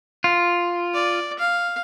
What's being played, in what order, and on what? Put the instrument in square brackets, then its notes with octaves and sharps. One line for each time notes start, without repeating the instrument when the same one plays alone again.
[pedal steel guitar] F4
[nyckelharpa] D5
F5